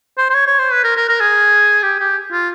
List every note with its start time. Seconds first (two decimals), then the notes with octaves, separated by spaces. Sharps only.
0.18 C5
0.30 C5
0.34 C#5
0.47 C#5
0.59 C5
0.72 B4
0.84 A#4
0.97 A#4
1.09 A#4
1.20 G#4
1.83 G4
2.00 G4
2.32 F4